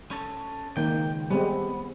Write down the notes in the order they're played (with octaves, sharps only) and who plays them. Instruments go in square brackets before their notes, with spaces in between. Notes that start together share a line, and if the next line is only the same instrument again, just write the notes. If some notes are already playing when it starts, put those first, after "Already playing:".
[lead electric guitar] C#4 A4
[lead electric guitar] C#2 G5 [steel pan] D#3 A#3
[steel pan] G3 G#3 C4 [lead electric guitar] B3